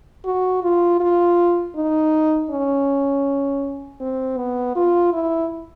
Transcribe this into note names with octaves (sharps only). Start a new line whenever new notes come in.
F#4
F4
F4
D#4
C#4
C4
B3
F4
E4